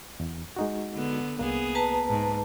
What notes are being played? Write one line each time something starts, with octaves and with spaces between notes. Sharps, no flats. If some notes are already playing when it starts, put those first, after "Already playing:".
E2
G#3 D#4 F#4
D3 B3
C2 A#3 B3 G#4
B4 A5 A#5
G#2